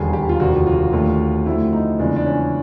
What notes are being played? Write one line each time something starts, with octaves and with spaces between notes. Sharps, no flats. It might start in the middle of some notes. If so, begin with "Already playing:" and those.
Already playing: E1 D#2 D3 G3 G#4
G4
F4
F1 D#2 D3 F#4
F4
D#2 D3 F#3 A3
F2 D3 F#3 A3 E4
D#4
E2 C#3 F3 G#3 D4
D4
C#4